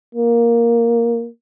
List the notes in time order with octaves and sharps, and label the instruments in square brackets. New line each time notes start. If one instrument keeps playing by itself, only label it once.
[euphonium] A#3